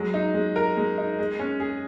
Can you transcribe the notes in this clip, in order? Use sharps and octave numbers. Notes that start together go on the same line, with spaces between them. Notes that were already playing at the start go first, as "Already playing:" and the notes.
Already playing: F#3 G#3
D#4
G#3
A#4
G#3
D#4
G#3
C#4
G#4